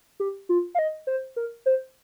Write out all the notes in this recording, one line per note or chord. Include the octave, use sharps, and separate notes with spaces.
G4
F4
F5
D#5
C5
A#4
C5